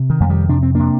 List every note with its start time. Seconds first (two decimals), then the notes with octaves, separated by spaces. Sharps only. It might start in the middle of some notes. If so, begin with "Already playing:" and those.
Already playing: C3
0.10 D#3
0.20 F2 A3
0.29 D#3 G3
0.49 C3 D4
0.63 C4
0.75 C3 A#3 D4